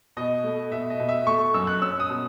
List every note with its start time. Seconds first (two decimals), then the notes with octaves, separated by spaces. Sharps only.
0.17 B2 D#5
0.44 A3
0.72 B2 E5
0.90 D#5
0.99 B2
1.09 E5
1.26 A3 C#6
1.54 F#2 E6
1.67 F#6
1.81 C#4 E6
2.00 D#6
2.10 B2